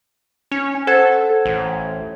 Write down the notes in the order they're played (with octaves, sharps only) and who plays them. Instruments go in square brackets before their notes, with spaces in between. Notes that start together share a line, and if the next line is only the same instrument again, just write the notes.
[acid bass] C#4
[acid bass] A4 [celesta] C5 F#5 G#6
[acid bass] A1